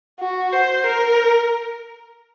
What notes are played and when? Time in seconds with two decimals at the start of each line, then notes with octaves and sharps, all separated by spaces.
0.20 F#4
0.52 C5
0.86 A#4